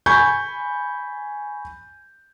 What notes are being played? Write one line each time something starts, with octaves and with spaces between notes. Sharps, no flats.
G#5 B5 C#6 G6 G#6